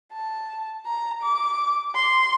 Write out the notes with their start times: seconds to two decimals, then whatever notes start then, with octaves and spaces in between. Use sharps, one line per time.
0.14 A5
0.86 A#5
1.22 D6
1.95 C6